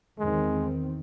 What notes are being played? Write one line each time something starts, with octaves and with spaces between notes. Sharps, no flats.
E2 D#3 G#3 C4